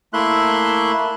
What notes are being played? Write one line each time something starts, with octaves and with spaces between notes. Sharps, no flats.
A3 A#3 E4 E5 C6 F#6